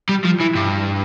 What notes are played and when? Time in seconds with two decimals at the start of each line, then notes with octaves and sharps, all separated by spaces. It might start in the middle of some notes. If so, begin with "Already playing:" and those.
0.09 G3
0.24 F3
0.40 E3
0.55 G2